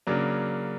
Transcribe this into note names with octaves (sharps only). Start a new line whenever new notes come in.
C#3 F#3 A#3 D4